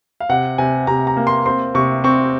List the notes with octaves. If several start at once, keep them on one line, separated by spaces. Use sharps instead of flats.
F5
C3 F#5
C3 G#5
C3 A#5
A#5
A#3
C6
C4 C6
C3 C#6
C4 C#6